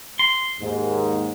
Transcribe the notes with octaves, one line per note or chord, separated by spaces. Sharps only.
C6
D#2 G#2